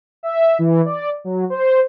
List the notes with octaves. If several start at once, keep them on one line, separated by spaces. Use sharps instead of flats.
E5
E3
D5
F#3
C5